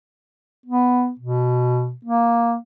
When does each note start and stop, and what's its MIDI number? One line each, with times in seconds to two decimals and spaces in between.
0.66 1.11 59
1.19 1.94 47
2.05 2.56 58